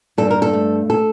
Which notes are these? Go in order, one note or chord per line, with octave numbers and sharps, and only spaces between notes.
G2 A4
A#4
A4
A3
A4